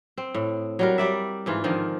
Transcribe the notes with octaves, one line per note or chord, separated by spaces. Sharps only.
C4
A2
F#3 G3 A#4
G3 D5 E5
G#2 E3 F4
G#2 D3 D#3 F3